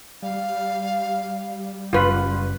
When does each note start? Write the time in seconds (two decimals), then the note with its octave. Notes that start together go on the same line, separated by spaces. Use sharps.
0.23 G3 F5
1.93 F#1 F#2 F4 B4